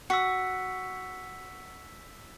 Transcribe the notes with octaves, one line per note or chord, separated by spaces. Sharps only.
F#4 E6 B6 C#7